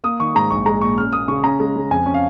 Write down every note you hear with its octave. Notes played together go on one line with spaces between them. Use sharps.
A#3 D#6
D#3 C#6
G#2 A#5
A#1 C#6
G#3 A#5
A#2 C#6
C#4 F6
A#3 D#6
C#3 C#6
C#4 A#5
G#3
C#3
F2 G#5
C#4
F5